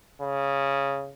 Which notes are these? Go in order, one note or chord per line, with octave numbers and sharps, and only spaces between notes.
C#3